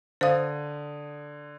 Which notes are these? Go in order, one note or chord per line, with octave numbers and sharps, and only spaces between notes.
D3 C5 F5 D#6